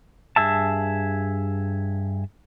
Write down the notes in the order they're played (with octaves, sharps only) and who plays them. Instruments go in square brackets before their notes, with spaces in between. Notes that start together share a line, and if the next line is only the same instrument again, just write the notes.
[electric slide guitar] G2 G#4 E5 A5